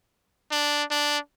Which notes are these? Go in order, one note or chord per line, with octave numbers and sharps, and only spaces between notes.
D4
D4